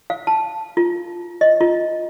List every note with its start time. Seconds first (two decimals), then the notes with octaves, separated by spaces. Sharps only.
0.10 F5
0.27 A5
0.77 F4
1.41 D#5
1.61 F4